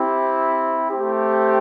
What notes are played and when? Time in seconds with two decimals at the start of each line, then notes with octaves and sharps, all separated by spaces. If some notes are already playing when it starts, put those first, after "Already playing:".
Already playing: C4 E4 G4
0.91 A3 C4 G4